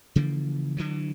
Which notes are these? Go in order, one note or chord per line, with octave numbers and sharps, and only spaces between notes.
C#3 E3 F3 A#3
D3 E3 F#3